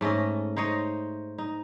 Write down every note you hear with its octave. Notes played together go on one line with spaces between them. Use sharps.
G#2 A3 C#4 D#5
D#4 C5 C#5 D#5
D#4